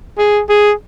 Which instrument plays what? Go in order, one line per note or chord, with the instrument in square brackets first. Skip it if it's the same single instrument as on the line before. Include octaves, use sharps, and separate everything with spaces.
[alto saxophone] G#4
G#4